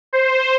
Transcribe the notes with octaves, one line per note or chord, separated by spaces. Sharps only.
C5